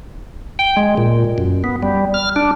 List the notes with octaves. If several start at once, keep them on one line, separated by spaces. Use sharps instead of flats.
G5
G#3
A#2
F#2
B3
G3
F6
D4